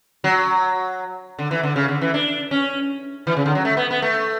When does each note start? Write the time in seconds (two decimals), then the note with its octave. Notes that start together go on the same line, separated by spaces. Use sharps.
0.24 F#3
1.39 D3
1.51 E3
1.63 D3
1.76 C#3
1.88 D3
2.01 E3
2.14 D4
2.51 C#4
3.27 E3
3.37 C#3
3.46 D3
3.55 F#3
3.65 A3
3.77 B3
3.91 B3
4.02 A3